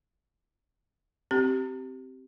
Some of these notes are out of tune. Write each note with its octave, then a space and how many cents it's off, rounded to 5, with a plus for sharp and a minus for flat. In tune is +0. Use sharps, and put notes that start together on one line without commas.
C4 +0 G4 -20